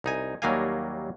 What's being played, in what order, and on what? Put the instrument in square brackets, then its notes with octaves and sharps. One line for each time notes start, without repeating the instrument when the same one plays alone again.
[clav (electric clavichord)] C2 D#4 G#5
D#2 F#3 G3 A#3 F5 G#5